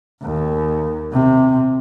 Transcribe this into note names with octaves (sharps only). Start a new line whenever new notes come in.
D#2
C3